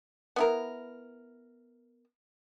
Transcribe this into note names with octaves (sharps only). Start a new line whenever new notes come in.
B3 E4 A#4